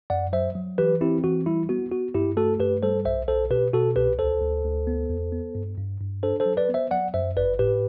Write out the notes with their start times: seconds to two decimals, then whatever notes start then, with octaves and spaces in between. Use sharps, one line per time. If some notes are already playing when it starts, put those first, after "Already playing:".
0.10 F#2 D5 F#5
0.33 F#3 C5 E5
0.55 F#3
0.78 E3 G4 B4
1.01 C4 E4 G4
1.24 E3 F#4
1.46 G3 E4
1.69 B3 F#4
1.91 B3 F#4
2.14 G2 E4 G4
2.37 A3 F#4 A4
2.60 G2 G4 B4
2.83 G3 A4 C5
3.05 B1 C5 E5
3.28 B1 A4 C5
3.51 B2 G4 B4
3.73 B2 F#4 A4
3.96 C2 G4 B4
4.19 D2 A4 C5
4.41 D2
4.64 D2
4.87 B3
5.09 E2
5.32 B3
5.55 G2
5.78 G2
6.00 G2
6.23 D4 A4 C5
6.40 A4 C5
6.46 F#3
6.57 B4 D5
6.69 B3
6.74 C5 E5
6.91 F#3 D5 F#5
7.14 F#2 C5 E5
7.37 G1 B4 D5
7.59 A2 G4 B4